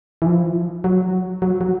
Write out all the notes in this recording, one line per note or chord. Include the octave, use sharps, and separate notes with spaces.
E3
F3
F#3
F#3
F#3